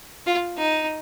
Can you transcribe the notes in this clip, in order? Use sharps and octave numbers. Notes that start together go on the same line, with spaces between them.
F4
D#4